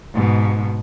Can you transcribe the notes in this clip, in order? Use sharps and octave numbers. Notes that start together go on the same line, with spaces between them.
G#2 B2